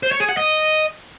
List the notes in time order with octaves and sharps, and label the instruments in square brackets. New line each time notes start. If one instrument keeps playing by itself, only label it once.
[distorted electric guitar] C5
C#5
G#4
F#5
D#5